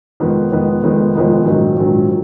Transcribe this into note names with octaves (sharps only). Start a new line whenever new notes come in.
F1 F2 D#3 G#3 B3
F1 F2 D#3 G#3 B3
F1 F2 D#3 G#3 B3
F1 F2 D#3 G#3 B3
A#1 G#2 D#3 F#3
A#1 G#2 D#3 F#3
F#3